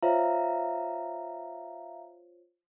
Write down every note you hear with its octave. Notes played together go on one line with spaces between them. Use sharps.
F4 C5 C#5 E5 F5 A#5